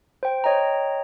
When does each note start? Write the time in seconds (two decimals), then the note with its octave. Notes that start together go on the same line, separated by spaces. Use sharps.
0.23 C5 G5
0.44 C#5 D#5 G5 A#5